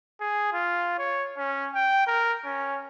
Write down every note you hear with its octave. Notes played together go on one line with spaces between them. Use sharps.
G#4
F4
C#5
C#4
G5
A#4
C#4